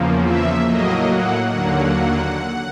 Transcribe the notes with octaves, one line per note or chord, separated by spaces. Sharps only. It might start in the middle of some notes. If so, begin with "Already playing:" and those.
Already playing: E2 C#3 F3 A#3
E5
A2 F#3 A#3 D#5
F#5
D#2 D3 F#3 A#3